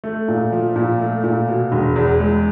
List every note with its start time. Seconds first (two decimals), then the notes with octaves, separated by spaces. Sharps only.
0.04 A3
0.28 A#2
0.52 F3
0.76 A#2
0.99 A3
1.24 A#2
1.48 B2
1.72 E1
1.96 E2
2.20 G#3